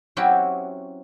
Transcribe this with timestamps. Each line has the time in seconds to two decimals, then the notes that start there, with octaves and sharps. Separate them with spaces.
0.17 F#3 C4 C#4 E4 F#4 G4